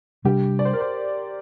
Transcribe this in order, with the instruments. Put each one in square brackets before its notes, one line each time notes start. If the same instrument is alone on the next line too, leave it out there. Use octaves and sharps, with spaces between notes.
[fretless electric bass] C3 G3 D4 [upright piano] G4
[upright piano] D5
C5
A#4
C5